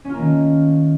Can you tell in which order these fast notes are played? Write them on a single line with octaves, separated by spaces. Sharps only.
C#4 F4 A#3 D#3 A3